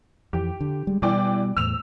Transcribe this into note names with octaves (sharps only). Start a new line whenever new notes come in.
F2 E3 G4
D3
G3 G#3
B2 E3 G3 D5 G5
E2 A2 E6 F7